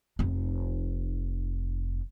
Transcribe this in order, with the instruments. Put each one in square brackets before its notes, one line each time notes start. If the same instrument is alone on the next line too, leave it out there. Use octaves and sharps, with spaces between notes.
[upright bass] F1 D#4